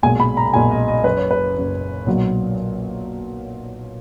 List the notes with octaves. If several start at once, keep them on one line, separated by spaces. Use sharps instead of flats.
B1 A#2 G#3 G#5
B5
A#5
B1 A#2 G#3 G#5
D#5
D#5
F#1 F#2 C#3 B4
C#5
B4
F#1 F#2 C#3
B1 A#2 F#3